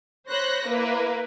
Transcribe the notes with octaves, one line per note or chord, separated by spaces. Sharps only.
C5 C#5 B5 F#6 A#6
A#3 E4 A#4 B4